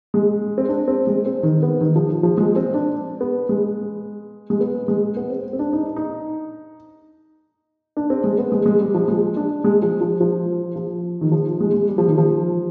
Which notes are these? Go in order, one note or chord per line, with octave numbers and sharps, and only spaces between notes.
G#3
C4
D4
C4
G#3
C4
D#3
B3
D#3
F3
F3
G#3
C4
D4
B3
G#3
G#3
B3
G#3
B3
C4
C4
D4
D#4
D#4
D4
C4
G#3
B3
G#3
G#3
G3
F3
G#3
D4
G#3
F3
F3
F3
F3
D#3
F3
G#3
G#3
G3
F3
D#3
F3